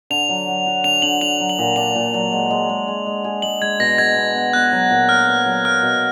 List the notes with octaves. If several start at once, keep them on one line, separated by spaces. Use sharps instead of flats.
D3 F7
F#3
F#3
F#4
D3 F7
D3 F#7
F#4 F7
F#3
F#7
A#2
D4 F7
A#2
F#3
G#3
G#3
G#3
G#3
G#3
G#4
G#3 F#7
G#3 G#6
B2 A#6
G#3 G#6
B3
B3
B3 F#6
F#3
A#2
F#3 F6
B3
F#3
A#3 F6
B2